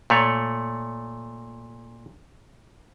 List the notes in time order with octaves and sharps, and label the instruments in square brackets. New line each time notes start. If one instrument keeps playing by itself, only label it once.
[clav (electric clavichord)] A#2 A3 C#5